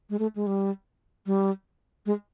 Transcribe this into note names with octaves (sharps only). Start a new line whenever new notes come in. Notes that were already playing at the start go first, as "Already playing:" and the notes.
G#3
A3
G#3
G3
G3
G#3